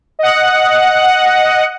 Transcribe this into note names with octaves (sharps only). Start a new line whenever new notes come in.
D#5 F#5